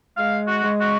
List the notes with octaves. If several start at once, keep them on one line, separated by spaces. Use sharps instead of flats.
G#3 F5
F#4
G#3
F#4